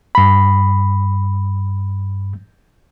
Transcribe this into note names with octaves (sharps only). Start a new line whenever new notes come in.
G2 B5